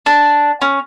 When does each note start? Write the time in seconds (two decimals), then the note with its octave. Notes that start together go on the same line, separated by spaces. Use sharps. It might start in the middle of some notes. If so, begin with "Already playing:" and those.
0.06 D4
0.62 C#4